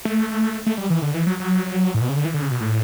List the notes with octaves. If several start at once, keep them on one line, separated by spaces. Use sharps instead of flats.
A3
A3
G3
E3
D3
E3
F#3
F#3
A2
B2
C#3
D3
E3
D3
C#3
B2
A2